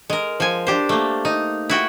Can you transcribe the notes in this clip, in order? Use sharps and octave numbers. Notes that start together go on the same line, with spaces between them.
G#3 A#4
F3 G#5
D4 G4 C5
A3 A#3
D#4
E4 F#4 G5